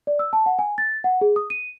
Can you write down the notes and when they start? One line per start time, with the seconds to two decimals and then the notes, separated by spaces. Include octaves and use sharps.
0.07 D5
0.19 E6
0.33 A5
0.46 F#5
0.59 G#5
0.78 A6
1.04 F#5
1.21 G#4
1.36 D#6
1.50 D#7